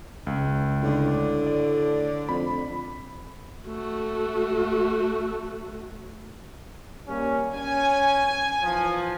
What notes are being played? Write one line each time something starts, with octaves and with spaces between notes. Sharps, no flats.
C#2
A2 D3
D5
F2 B5
A3 F#4
G3 A#3 C#4
C#4 G#5
E3 F3